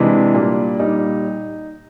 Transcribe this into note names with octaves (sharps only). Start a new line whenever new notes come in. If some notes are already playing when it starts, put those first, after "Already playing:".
Already playing: C3 E3 G#3 D4
A#2 G3
A#2 G3 D#4